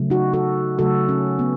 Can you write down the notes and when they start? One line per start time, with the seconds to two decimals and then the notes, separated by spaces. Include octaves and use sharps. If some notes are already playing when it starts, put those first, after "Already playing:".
Already playing: C#3 F#3 A3
0.10 D#4 F#4
0.33 F#4 A4
0.78 C#3 F#3 A3 F#4 A4
1.09 C#4
1.39 B3